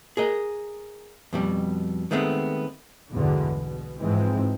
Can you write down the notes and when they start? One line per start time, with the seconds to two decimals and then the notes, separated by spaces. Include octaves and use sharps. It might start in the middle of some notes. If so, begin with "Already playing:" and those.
0.17 G#4 A#4 D#5
1.33 F2 B2 G3
2.11 D#3 G#3 A3 B3 C4
3.11 B1 E2 G2 B2 D3 G#3
3.56 B2
4.00 G#2 E3 F3 G#3 C4